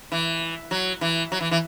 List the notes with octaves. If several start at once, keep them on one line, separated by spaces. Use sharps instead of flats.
E3
F#3
E3
F#3
E3
E3